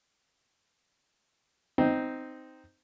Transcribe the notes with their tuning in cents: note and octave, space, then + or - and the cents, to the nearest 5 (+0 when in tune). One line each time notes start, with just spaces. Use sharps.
C4 -10 D#4 +0